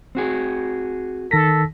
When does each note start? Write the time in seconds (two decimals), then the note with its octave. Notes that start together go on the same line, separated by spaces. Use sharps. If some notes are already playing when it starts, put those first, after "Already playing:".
0.15 C4 F#4 G#4
1.31 D#3 A4 A#6 B6